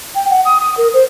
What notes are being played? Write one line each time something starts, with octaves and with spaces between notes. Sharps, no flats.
G5
F#5
D#6
D#6
A#4
C5